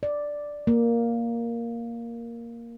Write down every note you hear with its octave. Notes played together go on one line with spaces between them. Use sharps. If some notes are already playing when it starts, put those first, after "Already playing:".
D5
A#3